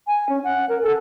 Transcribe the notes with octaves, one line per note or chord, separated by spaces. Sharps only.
G#5
C#4
F#5
A#4
A4